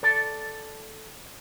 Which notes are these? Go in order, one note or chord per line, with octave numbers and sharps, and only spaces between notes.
A4 D5 A5